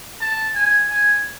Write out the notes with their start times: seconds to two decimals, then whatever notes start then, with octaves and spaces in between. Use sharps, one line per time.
0.21 A5
0.55 G#5
0.89 G#5